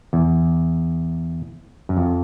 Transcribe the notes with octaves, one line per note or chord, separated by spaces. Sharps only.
E2
F#2
F2